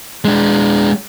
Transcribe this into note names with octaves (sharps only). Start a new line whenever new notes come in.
G#3 D4